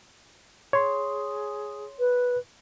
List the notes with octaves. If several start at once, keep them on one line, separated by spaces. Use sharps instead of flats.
G#4 C#5 C6
B4